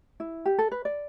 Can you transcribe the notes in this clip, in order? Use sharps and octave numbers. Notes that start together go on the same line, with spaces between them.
E4
G4
A4
B4
D5